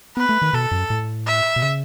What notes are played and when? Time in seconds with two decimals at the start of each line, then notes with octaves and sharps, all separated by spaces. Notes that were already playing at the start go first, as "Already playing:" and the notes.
0.17 B3 B4
0.29 A3
0.42 D#3
0.53 B2 A4
0.71 F#2
0.90 A2
1.27 E5
1.56 B2
1.63 C#3